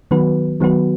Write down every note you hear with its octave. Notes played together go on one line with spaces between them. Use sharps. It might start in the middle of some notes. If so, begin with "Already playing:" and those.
D#3 F#3 B3 F#4 B4
D#3 F#3 B3 F#4 B4